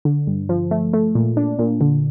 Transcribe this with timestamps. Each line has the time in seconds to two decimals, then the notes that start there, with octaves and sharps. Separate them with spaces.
0.05 D3
0.27 G2
0.49 F3
0.71 A3
0.93 A3
1.15 A#2
1.37 D4
1.59 A#2
1.81 D3